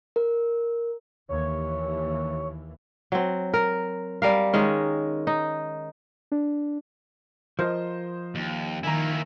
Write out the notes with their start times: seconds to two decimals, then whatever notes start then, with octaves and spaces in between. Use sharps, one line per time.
0.16 A#4
1.29 D#2 E3 C#5
3.12 F#3 C4
3.54 A#4
4.22 G3 A#4 F5
4.53 D#3 G#3 C#4
5.27 D#4
6.32 D4
7.59 F3 A#4 C5 D#5
8.35 D#2
8.83 D#3 A#3 E4 G#5 A#5